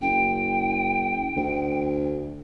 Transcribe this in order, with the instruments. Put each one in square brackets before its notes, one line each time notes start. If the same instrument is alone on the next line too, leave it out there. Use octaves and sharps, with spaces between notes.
[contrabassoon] F#1 [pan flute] G5
[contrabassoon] D2